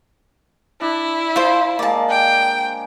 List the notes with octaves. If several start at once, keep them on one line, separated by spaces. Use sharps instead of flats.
D4 E4
F3 F4 C5
G#3 A#3 D5 A5
G5